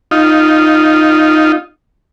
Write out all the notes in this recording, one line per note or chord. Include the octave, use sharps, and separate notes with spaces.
D#4 F4